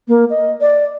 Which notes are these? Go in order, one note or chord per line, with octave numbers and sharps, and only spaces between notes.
A#3
D#5
D5